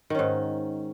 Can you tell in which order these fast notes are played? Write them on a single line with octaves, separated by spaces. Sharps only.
D#3 C#4 G#2